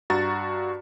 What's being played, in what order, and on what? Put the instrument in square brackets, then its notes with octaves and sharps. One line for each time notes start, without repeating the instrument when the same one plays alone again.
[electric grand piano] G2 F#4 A#5 A6